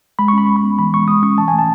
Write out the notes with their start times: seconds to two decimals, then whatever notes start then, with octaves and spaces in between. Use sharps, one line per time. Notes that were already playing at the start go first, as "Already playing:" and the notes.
0.19 G#3 B5
0.28 C#6
0.33 C#4 B5
0.47 G#3 C#6
0.56 B5
0.63 B3
0.79 E3 B5
0.93 G#3 C#6
1.08 G#3 D#6
1.23 C#4 C#6
1.38 E3 A5
1.48 G#5
1.54 A3 A5